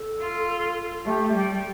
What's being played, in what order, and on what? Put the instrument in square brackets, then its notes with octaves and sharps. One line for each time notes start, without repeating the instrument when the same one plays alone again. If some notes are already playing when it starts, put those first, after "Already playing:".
Already playing: [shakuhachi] A4
[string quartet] F4
[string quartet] A3 [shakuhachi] G4
[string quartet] G3